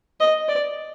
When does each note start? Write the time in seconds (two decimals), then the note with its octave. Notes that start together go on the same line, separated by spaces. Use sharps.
0.20 D#5
0.48 D5